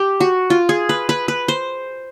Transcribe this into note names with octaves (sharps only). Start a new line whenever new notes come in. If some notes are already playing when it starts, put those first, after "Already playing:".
Already playing: G4
F#4
F4
G#4
B4
B4
B4
C5